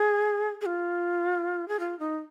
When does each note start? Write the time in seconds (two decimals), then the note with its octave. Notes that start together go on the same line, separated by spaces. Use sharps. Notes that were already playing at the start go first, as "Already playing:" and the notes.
Already playing: G#4
0.61 G#4
0.66 F4
1.68 G#4
1.80 F4
1.99 D#4